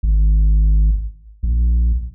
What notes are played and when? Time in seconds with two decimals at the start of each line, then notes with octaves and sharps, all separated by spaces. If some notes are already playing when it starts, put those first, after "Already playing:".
0.03 G#1
1.43 A#1